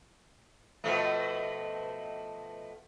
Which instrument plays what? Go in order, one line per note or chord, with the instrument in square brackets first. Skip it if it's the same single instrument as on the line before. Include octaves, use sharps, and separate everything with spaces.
[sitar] B2 F3 A3